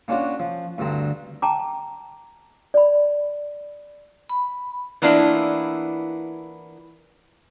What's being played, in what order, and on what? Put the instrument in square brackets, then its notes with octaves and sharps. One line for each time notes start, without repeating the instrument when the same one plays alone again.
[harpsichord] A#3 C#4 D4 F4 F#4
F3
D2 G2 D3 C4 A#5
[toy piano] G5 A5 A#5 D6
D5 B5
[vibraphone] B5
[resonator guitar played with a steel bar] E3 A#3 B3 D4 E4 F4